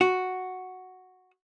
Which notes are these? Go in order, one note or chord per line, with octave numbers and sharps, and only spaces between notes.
F#4